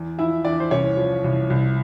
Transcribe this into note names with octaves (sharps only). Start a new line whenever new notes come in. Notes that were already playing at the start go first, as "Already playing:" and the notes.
Already playing: E2
F3 E4 E5
E2 D4 D5
C5
C2 C#4 C#5
F3
C2
C2